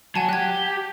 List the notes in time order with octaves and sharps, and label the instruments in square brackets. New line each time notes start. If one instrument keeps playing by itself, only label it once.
[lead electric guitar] F#3 [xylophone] F#5 G#5 A5
[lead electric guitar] G4 [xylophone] F#6 G#6